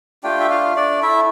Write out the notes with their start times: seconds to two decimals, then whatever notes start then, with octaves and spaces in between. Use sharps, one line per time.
0.23 A3 D4 F4 G4 G5
0.40 E5
0.50 F4 F5
0.76 D4 D5
1.03 E4 E5